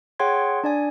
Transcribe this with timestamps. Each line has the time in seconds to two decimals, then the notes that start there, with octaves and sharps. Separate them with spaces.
0.19 G#4 C#5 F#5 G5 C6 G#6
0.64 D4 D5 G#5